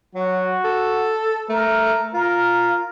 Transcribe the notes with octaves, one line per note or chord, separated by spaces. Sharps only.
F#3 F#4
A4
A3 A#4
F4 A#4